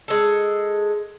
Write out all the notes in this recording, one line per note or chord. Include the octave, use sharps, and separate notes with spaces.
G#3 A4